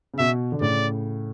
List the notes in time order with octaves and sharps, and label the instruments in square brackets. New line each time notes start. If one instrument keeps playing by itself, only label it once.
[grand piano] C#3
[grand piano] B2 [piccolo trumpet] E5
[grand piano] D3
[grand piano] A2 C#3 [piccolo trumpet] D5